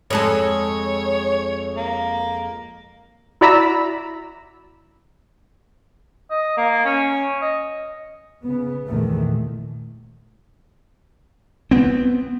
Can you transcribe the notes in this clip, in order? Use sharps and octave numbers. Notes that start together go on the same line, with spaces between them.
F2 G#3 A4 C#5
A#3
E4 F#4 D5 A#5 B5 E6
D#5
A#3
C#4
D#5
C#3 B3
A#1 E2 D#3 A3
B3 C4